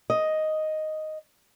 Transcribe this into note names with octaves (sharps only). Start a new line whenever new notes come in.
D#5